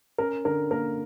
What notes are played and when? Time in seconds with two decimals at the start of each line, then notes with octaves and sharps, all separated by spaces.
0.18 C#4 A#4
0.45 D3 A#4
0.71 A#3 A#4